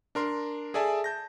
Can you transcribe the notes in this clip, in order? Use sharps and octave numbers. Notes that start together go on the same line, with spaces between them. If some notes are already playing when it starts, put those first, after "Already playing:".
D4 A#4 C6
G#4 A4 D5 E5 G#5 A5
A5 G6 A#6